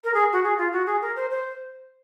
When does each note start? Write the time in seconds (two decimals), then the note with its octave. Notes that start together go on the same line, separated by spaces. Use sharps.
0.04 A#4
0.14 G#4
0.32 F#4
0.43 G#4
0.57 F4
0.72 F#4
0.86 G#4
1.01 A#4
1.16 C5
1.30 C5